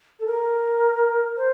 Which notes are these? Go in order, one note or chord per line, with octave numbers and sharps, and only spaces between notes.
A4
A#4
C5